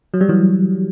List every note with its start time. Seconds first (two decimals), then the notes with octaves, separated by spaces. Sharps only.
0.14 F#3
0.21 G3
0.29 E3 F#3